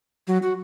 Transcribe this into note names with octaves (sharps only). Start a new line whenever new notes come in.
F#3
F#4